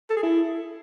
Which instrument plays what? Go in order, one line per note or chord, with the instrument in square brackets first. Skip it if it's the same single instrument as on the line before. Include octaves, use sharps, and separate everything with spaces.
[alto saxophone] A4
G#4
E4